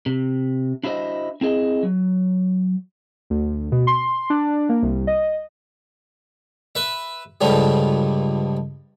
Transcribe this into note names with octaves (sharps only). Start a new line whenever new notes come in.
C3
D4 E4 F#4 G4 C5 D#5
C4 E4 G#4 D#5
F#3
D2
B2
C6
D4
A#3
C2
D#5
B4 E5
C#2 G2 D3 F3 G3